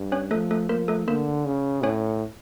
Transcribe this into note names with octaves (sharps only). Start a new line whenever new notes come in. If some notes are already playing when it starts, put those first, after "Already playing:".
Already playing: G2
C#4 C#5
F3 A3 A4
A3 A4
F3 A#3 A#4
A3 A4
D3 A#3 A#4
C#3
A2 C#4 C#5